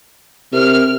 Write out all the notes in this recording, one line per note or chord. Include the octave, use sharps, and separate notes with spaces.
C3 A#4 F6